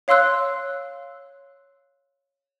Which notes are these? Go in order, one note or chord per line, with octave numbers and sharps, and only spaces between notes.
C#5 F5 C6 E6 F#6